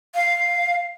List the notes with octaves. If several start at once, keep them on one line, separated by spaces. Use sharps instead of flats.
F5